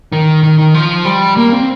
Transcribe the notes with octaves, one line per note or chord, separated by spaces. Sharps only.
D#3
D#3
D#3
F3
G3
A#3
C4